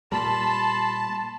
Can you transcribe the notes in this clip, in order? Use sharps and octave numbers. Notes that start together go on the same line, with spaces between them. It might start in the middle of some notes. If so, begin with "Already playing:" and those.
A#2 G3 A5 B5 C6